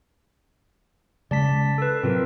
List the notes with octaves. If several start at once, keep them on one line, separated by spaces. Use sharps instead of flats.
C#3 G#3 D5 A5 B6
A4 B4
A2 C3 F#3 C4 F4 A#4